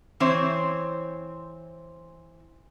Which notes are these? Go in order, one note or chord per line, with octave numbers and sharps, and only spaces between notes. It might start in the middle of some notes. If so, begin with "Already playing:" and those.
E3 C4 C5 C#5